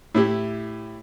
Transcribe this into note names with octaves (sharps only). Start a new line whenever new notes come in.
A2 E4 G4